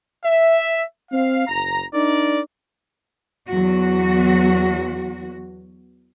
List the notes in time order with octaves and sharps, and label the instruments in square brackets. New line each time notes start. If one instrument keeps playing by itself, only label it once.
[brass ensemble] E5
C4 F5
F#1 A#5
D4 D#4 A#4 D5
[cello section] E2 F#3 F#4